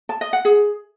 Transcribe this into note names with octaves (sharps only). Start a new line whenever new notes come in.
A5
D#5
F#5
G#4